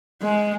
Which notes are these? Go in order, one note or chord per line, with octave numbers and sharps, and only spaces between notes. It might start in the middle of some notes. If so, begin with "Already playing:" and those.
G#3